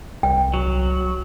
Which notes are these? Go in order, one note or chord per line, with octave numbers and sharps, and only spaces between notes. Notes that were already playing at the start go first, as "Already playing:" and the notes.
C2 G5
F#3